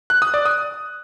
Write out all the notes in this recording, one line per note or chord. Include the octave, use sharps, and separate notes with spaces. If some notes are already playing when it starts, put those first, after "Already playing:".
F#6
D#6
D5
D#6